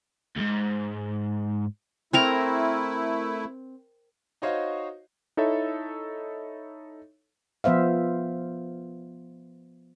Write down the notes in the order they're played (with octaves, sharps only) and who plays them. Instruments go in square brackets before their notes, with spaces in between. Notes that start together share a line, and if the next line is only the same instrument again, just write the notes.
[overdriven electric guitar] D2 G#2
[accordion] A3 E4 [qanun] C4 A#4 A#5
[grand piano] D#4 F#4 C5 C#5 D#5 F5
[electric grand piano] D#4 E4 A4 C#5 E5
[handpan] F3 B3 C5 E5 F5